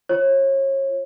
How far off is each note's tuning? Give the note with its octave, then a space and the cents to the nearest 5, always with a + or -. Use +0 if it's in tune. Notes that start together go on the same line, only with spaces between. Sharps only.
F4 +0 C#5 -35